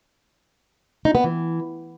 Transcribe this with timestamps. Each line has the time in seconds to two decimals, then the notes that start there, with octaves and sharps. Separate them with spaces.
1.05 D#4
1.15 B3
1.24 E3